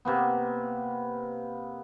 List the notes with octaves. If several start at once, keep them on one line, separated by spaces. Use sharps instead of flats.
C3 A#3 B3